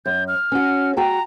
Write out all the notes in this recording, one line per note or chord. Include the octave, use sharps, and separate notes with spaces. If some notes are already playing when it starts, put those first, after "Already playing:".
F#2 G6
F6
C#4 F#4
F#4 G5 A5 A#5